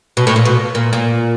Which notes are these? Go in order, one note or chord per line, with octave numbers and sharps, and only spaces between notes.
B2
A2
A#2
B2
A#2
A#2